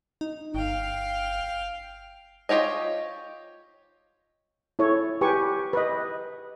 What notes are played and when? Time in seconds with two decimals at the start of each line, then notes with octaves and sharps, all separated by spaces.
0.21 D#4
0.54 G1 F5 G5
2.49 F4 G4 C#5 D#5
4.79 E4 A4 C#5
5.21 G4 B4 G#5 C#6
5.73 B4 D#5